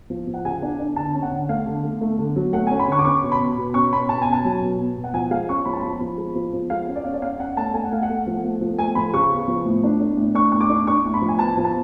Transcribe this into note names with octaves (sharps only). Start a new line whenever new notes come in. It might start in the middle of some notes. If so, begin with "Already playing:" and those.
F3
F3
F#5
C#3 G#5
D4
D4
D3 A5
C#4
F#5
D3
A3 F5
D3
A3
A3
D3
F#3
A3 F#5
G#5
C#4
B5
D3 C#6
D6
C#4 C#6
B2
B5
B2
B2
C#4 C#6
B2 B5
B2 A5
G#5
C#4
A5
F#3
B2
B2
B2
F#5
F3 G#5
G#3 F5
C#4 C#6
F3 B5
A5
F3 B5
F3
G#3
F3
F3
G#3 F5
C#4
D5
C#4 F5
D5
C#4 F5
C#4 F#5
A3 A5
A3 G#5
F#5
A3 F5
F#5
A3
F3
A3
F3
A3 G#5
F3 B5
C#3 C#6
B3
F3
A2
D4
D4
A2
D4 C#6
A2 C#6
D6
D4
D4 C#6
A2
B5
F3
G#5
B3 A5
F3
A5